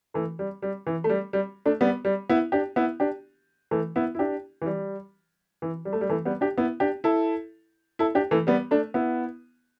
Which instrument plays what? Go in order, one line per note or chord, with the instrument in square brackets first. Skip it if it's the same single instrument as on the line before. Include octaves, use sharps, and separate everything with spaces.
[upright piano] E3 A3
G3
G3
E3
A3
G3
G3
A3 D4
G3 B3
G3
B3 E4
D4 G4
B3 E4
D4 G4
E3 A3
B3 E4
E4
D4 G4
E3
G3
E3
G3
A3
G3
E3 A3
G3 B3
D4 G4
B3 E4
D4 G4
E4 A4
E4 A4
D4 G4
E3 A3
G3 B3
A3 D4
B3 E4